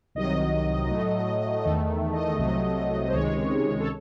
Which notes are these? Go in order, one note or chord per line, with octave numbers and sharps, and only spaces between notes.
C2 C3 D#3 F#3 D#5
A2 F#3 A3
E2 D#3 A3
D#5
C2 C3 F#3 A3
C5
C#2 C3 D#3 G#3 C#5
A4